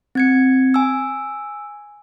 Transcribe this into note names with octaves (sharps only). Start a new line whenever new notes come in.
C4 G#6 C#7
G#5 E6